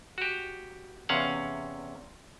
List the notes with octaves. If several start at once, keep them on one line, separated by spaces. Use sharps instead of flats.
F#4 G4
E2 C3 C#4 F5 F#5